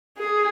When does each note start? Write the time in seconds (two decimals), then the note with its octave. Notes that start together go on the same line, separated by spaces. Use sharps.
0.18 G#4